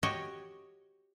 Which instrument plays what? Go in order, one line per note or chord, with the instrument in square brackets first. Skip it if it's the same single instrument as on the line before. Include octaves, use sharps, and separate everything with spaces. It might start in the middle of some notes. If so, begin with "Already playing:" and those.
[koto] F#4 G4 C#5 D#5